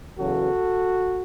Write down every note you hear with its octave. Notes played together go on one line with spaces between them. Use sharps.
E2 C#3 F#3 B3 F#4 A4